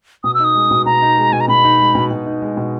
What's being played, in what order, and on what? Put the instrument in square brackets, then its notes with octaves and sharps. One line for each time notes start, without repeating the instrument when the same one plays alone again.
[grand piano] B2 [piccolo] D#6
[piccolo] E6
[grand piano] D#4 [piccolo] D#6
[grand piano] G#3
B2
[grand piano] B2 [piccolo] A#5
[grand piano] D#4
G#3
[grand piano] B2 [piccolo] G#5
[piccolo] A#5
[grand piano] B2 [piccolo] B5
[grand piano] D#4
G#3
B2
B2
D#4
G#3
B2